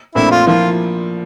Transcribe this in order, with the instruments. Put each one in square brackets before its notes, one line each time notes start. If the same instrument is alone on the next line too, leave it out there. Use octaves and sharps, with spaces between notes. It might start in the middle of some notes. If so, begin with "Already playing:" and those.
[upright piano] A#1 A#2 A3 C4 [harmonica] E4
[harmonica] F4
[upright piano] F3 A#3 E4 [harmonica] F4